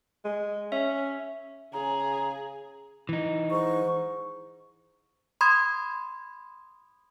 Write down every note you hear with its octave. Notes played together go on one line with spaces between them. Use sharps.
G#3
C#4 E5
C#3 G#4 A#5
E3 D#4
G#2 C#6
B5 C6 D#6 G#6